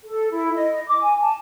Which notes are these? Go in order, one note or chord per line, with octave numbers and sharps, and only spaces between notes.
A4
E4
D#5
D6
G#5
A5